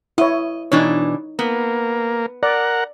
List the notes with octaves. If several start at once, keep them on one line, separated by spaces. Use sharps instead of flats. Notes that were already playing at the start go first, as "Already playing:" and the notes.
E4 C#5 D#5
B2 E3 D4 D#4 C#5
A#3 B3
A#4 D5 F#5